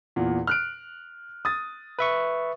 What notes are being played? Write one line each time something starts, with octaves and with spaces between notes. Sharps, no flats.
E2 A#2
F6 F#6 D7
D#6 A6
B4 E5 C#6